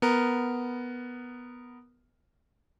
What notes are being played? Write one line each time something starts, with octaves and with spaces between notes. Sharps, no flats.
B3 A#4